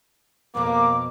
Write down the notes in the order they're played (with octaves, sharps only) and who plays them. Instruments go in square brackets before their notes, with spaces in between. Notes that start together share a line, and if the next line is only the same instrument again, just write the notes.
[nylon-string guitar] F2 B2 [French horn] A#3 [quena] D6